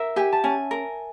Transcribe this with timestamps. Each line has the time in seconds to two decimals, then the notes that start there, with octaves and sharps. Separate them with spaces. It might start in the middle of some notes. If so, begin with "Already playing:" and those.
Already playing: A#4 E5
0.16 G4 G#5
0.32 A5
0.44 C#4 G#5
0.71 A#4